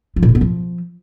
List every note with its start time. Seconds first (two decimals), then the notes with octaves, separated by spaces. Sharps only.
0.16 F3
0.23 A#2
0.29 D3
0.35 B3
0.41 F3